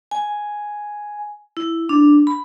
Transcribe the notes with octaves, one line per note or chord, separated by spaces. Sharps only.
G#5
E4
D4
B5